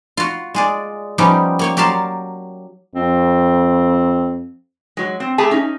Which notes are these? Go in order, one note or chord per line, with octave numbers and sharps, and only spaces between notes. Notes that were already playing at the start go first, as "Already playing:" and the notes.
F4 F#4
G#3 G#4 D5
F3 G3 B3 C#4 D#4 G4
A#3 C#5 G5
F#3 G4 A#4 F5 A5 C6
F2 C4
F#3 G#3
C4
A3 G4 G#4 G#5 A5
C#4 D#4